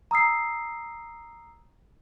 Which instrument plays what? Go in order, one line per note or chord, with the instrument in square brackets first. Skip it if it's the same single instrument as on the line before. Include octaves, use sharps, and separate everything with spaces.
[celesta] A#5 D#6 E6 C7